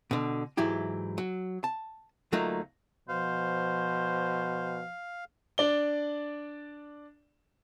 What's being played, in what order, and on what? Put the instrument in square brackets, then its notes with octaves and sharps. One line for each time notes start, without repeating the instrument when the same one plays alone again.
[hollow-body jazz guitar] B2 D3
G#2 E3 F#3 E4 G4
F#3
A5
D2 F#3 A3 A#3 D#4 F4
[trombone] B2 [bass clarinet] F3 [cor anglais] C5 [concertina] F5
[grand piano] D4 D5 G7